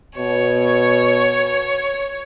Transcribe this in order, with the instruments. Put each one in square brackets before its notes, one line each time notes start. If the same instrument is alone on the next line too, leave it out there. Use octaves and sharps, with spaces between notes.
[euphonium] B2 [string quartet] C#5